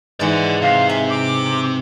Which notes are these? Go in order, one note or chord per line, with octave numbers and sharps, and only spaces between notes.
G#2 E3 D5 F#5
C3 F5
E5 G#5
D6